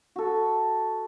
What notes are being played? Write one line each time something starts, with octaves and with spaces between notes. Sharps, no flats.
F#4 A4